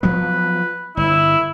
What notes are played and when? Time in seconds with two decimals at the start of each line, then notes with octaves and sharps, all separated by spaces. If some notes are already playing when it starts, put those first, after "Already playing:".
0.03 F3 F#3 B3 B4
0.97 G1 E4